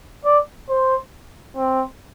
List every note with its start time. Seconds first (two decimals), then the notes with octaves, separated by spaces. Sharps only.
0.25 D5
0.69 C5
1.57 C4